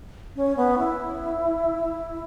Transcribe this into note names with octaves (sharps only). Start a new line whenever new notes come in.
C#4
B3
E4